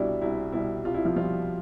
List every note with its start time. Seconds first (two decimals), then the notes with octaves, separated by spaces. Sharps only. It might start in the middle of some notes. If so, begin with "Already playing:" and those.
Already playing: C2 B2 G3 D4 E4
0.21 C2 E4
0.52 B2 G3 E4
0.85 C2 F4
0.94 E4
1.05 F3 F4
1.16 B2 F3 G3 F4